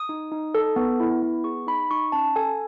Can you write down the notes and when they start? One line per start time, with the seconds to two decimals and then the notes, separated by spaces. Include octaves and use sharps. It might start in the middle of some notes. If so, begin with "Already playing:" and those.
Already playing: D#6
0.09 D#4
0.32 D#4
0.55 A4
0.76 B3
1.00 E4
1.22 B3
1.44 G#4 C#6
1.67 D#4 B5
1.91 D#4 C#6
2.12 C#4 A5
2.36 A4 G#5